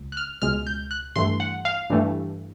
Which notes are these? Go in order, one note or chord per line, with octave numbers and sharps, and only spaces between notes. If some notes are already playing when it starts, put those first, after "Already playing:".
Already playing: C#2
F#6
F6
C#2 B2 G#3 F6
G6
F#6
G2 E3 A3 C6
F#5
F5
G2 E3 A3